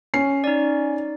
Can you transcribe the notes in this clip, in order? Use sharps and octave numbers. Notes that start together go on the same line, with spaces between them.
C#4 C7
D#4 D5